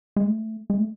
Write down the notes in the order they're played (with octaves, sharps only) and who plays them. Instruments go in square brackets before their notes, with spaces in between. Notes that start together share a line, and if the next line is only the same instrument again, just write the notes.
[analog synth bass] G#3
A3
G#3
A3